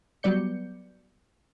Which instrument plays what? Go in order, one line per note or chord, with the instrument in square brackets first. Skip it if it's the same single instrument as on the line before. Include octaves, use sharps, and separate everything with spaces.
[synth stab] F#3 G3 B3 D5 G6 C#7